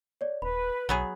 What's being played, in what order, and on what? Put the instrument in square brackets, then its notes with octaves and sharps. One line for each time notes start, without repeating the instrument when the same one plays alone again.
[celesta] C#5 D5
[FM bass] D#1 [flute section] B4 [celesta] B5
[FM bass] B1 [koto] F#3 B3 G#4